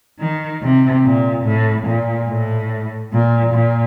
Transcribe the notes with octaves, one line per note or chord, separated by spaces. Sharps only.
D#3
C3
A#2
A2
A#2
A2
A#2
A#2